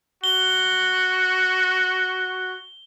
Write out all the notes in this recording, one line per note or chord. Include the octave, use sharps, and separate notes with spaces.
F#4 G7